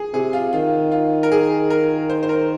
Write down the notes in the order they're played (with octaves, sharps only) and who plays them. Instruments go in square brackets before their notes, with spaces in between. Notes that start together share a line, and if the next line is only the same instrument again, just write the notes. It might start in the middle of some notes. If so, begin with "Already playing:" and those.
Already playing: [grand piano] G#4
[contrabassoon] C3 [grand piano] G#4
[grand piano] F4
[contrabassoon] D#3 [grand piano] F4
[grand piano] F4
A#4
G#4
A#4
C5
C5
A#4